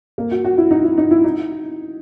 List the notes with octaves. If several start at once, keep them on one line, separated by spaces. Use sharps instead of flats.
A#3
F#4
F#4
E4
D#4
E4
D#4
E4
D#4